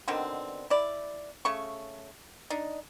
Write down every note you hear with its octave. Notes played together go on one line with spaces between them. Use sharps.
B2 D3 D#3 C4
E4 D5
C#3 A3 C#6
D4 D#4